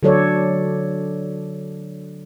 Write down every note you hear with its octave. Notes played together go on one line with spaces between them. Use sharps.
D3 F#3 A4 C#5 D5